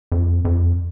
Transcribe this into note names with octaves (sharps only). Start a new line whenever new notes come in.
F2
F2